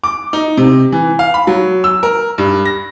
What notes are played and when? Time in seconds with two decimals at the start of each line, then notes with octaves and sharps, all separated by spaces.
0.04 D6
0.33 D#4
0.57 C3
0.92 E3
1.19 F5
1.34 B5
1.47 F#3
1.84 E6
2.03 A#4
2.38 G2
2.65 A#6